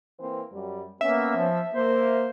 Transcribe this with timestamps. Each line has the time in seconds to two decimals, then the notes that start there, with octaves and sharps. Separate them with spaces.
0.19 E3 A#3 C4
0.52 F#2 G3
1.01 A#3 B3 C#4 E5
1.36 F3
1.74 A#3 C5